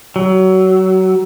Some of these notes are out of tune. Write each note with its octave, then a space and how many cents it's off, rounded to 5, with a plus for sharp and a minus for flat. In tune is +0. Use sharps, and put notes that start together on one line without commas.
F#3 +25